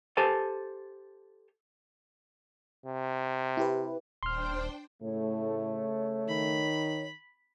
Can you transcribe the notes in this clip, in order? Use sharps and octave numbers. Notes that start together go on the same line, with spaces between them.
G4 A4 C5 G#5 A5
C3
E4 G4 B4
D#1 D4 C5 G5 C6 F6
A2 C#3 A3 C#5
D#3 B5